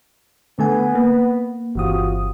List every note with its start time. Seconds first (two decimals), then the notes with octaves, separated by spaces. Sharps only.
0.59 D3 A3 B3 G#5
0.95 A#3
1.75 G1 C3 E3 F4 F#4 D#6